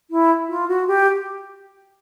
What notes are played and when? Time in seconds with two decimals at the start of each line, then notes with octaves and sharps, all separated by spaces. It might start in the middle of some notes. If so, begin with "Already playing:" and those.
0.11 E4
0.49 F4
0.68 F#4
0.87 G4